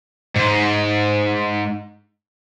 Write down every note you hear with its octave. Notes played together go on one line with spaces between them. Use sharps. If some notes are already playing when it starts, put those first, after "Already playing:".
G#2